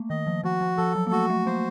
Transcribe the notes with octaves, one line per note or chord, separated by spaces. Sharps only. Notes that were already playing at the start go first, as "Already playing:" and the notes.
Already playing: A3 A#3
D#3 D#5
F3
F3 F#4
F3
F3 A4
F#3
A#3
A3 F#4
A3
A#3 C5